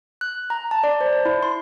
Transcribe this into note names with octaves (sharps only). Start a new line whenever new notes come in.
F#6
A#5
A5
D5
C5
E4
C6